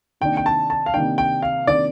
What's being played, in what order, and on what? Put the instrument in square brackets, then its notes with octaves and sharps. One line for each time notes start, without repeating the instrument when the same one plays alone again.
[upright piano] C3 D#3 A#3 D4 [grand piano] G5
[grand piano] G5
A5
A5
F5
[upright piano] C3 D#3 A#3 D4 [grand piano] G5
[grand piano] G5
F5
[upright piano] C3 D#3 A#3 D4 [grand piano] D5